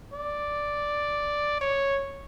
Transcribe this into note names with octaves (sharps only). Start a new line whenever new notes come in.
D5
C#5